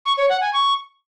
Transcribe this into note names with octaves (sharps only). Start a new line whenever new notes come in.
C#6
C#5
F#5
G#5
C#6